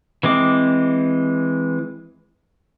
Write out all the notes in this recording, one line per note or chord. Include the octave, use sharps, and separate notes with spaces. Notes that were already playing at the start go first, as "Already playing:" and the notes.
E3 G#3 C4 D6